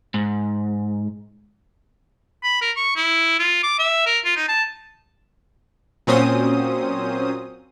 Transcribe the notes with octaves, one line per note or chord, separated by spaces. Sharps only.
G#2
B5
A#4
C#6
E4
F4
D6
E5
A#4
F4
D#4
A5
A#2 F#3 C4 C#4 C5 D#6